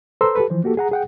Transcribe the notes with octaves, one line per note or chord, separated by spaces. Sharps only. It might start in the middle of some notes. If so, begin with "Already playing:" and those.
A4 B4 C5 A#5 C6 E6
G4 A4 B4
E3 F3 C5
A#3 F#4 G4 A4
G#4 F#5 A#5
G#4 F#5 G5